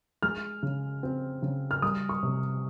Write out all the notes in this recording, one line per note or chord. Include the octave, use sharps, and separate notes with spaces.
G#3 F6
C#3
C4
C#3
F6
G3 D#6
C#6
C3